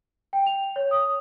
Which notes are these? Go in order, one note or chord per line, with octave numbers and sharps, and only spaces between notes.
G5
F7
C#5
D#6